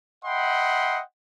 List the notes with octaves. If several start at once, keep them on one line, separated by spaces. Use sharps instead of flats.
D#5 E5 F#5 G5 B5 C6